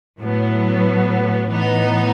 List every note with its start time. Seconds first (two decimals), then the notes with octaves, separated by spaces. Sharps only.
0.19 A2 F#3 B3
1.47 A2 E3 B3 D#4